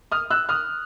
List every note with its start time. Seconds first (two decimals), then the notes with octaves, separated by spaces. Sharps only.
0.12 D#6 F6
0.30 E6 F#6
0.49 D#6 F6